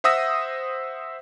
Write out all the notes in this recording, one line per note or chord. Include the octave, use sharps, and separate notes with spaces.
C5 E5 F#5 D#6 E6 A#6